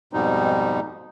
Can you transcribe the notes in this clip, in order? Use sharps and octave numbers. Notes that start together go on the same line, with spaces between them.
F2 G#2 B2 G3 D#4